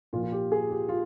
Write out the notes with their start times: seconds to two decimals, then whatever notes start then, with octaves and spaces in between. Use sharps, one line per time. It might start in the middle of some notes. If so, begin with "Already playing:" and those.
0.13 A#2 F3 F4
0.23 F4
0.32 G4
0.52 G#4
0.71 G4
0.89 F4